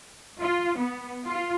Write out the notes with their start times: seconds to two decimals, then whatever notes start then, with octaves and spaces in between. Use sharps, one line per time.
0.40 F4
0.77 B3
1.25 F4